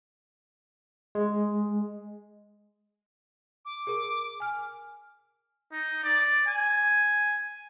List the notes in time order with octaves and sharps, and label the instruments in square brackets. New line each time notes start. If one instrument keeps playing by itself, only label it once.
[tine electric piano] G#3
[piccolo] D6
[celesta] G#4 A#4
G#5 F6
[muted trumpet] D#4
D5
G#5